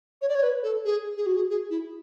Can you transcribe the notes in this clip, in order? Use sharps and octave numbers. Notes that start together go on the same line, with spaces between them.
C#5
D5
C#5
B4
A4
G#4
G#4
F#4
G#4
G#4
E4